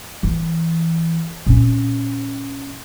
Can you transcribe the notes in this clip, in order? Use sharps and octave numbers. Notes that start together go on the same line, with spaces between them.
E3
A#2 C#4